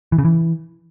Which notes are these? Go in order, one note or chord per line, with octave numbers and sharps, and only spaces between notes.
E3
C#3
E3